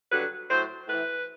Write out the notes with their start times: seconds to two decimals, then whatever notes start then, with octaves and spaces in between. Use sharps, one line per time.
0.11 G2 D3 F#3 B4
0.50 A2 F#3 C5
0.88 A2 E3 B4